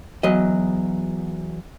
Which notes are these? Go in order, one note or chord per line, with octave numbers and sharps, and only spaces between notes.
E2 F#3 D#5